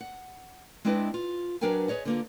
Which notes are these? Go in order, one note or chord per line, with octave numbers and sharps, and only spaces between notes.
F#5
G#3 C4 D4 E4 B4 D#5
F4
F#3 D4 A#4 B4 G5 G#5
G#4 B4 C#5 D#5
D3 A#3 F4